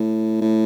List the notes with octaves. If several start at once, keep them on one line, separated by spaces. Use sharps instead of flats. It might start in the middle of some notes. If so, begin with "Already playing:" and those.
Already playing: A2
A2